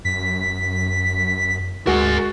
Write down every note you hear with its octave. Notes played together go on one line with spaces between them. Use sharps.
F#2 B6
D2 G#3 F#4 A#4 G#5